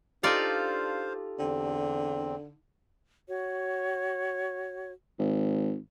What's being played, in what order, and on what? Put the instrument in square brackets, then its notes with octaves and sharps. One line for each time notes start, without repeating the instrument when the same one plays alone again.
[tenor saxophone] D4 [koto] D#4 F4 D5 [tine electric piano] G4 A4 [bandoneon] C5 F5
[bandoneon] E2 C4 [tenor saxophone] D3
[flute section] F#4 C#5
[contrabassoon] G#1